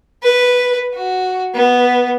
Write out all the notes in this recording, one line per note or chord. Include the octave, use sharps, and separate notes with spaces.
B4
F#4
B3